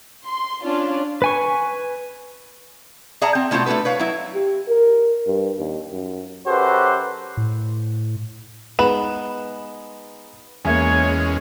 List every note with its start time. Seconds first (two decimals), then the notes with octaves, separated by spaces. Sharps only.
0.23 C6
0.64 C#4 D4 F4
1.22 B4 G#5 C#6
3.22 G#4 D5 E5 F#5 A5 A#5
3.35 C4
3.51 B2 A3 E4 F4 C5 F#5
3.66 A3 D4 F#4 A4 B4
3.85 B4 C#5 F5
3.99 F#3 E4
4.34 G4
4.68 A#4
5.27 G2
5.58 D#2
5.91 F#2
6.47 F#2 F#4 G4 A4 B4 C5
7.37 A2
8.79 G#3 B3 D#4 B4 E7
10.65 E2 G#3 A#3 C#4 C#5 E5 G#5